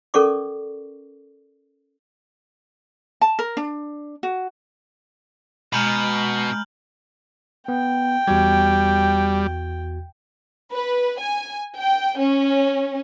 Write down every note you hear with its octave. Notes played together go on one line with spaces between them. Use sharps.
C#4 A4 A#4 D5 C#6 D6
A5
A#4
D4
F#4
B2 G#3 G#5 A#5 B5 F6 G6 F#7
B3 G5
E2 G3 F#4 G#6
B4
G#5
G5
C#4